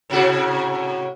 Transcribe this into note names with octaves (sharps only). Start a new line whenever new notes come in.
A2 C3 F#4